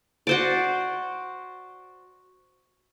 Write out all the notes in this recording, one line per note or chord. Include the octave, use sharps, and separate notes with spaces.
F#4 C5 D5